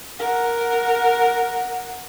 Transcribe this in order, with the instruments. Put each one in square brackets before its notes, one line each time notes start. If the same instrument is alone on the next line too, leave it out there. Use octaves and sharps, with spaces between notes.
[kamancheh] A#4 F#5